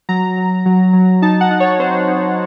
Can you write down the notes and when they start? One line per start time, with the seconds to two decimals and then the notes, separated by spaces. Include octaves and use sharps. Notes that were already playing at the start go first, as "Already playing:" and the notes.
0.09 F#3 A#5
0.37 F#3
0.66 F#3
0.93 F#3
1.22 D#4 A5
1.41 F#5
1.51 D#4
1.60 C#5
1.79 C4 C5
2.08 D#4